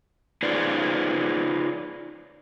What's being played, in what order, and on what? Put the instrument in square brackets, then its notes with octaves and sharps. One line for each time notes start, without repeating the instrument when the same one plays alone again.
[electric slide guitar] D#4 F4 G#4 B4 C5 D5